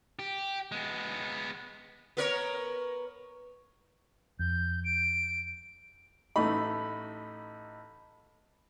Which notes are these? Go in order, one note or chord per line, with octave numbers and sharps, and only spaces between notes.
G4
G#3 B3
B3 A#4 C#5
F2 G6
D7
A1 A3 D#4 B5